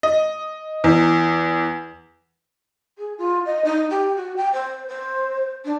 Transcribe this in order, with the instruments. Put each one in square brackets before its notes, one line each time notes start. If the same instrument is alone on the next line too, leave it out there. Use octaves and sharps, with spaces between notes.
[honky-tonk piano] D#5
E2
[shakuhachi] G#4
F4
D#5
D#4
G4
F#4
G5
C5
C5
D4